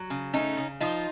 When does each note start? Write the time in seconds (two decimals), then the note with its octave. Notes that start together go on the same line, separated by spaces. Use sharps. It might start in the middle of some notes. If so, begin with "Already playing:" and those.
Already playing: F#3
0.10 C#3
0.34 A3 C#4 D#4
0.57 C#3
0.81 F3 D#4 F4